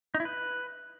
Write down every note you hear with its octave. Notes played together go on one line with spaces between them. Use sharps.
D#4
E4
B4